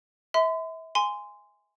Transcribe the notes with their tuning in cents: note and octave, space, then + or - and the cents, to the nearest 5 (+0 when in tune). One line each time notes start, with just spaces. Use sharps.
E5 -30 C6 -45
G#5 -10 C6 -15